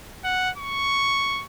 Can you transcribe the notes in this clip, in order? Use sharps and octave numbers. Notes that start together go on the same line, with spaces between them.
F#5
C#6